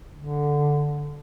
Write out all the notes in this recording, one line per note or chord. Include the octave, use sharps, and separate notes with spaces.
D3